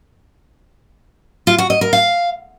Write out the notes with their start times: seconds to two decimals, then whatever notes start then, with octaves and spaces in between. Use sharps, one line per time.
1.47 F4
1.58 F#4
1.70 D#5
1.81 A#4
1.93 F5